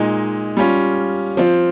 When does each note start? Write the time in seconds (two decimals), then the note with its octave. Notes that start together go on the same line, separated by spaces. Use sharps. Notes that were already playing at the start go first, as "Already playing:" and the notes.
Already playing: A#2 G#3 D#4
0.57 G3 C#4 F4
1.37 F3 C4 F4